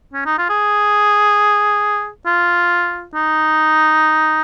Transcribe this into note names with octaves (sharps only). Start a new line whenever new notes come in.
C#4
D#4
F4
G#4
F4
D#4